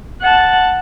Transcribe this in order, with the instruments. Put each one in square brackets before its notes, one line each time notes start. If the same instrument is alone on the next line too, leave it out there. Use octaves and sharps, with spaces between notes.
[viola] F#5 A5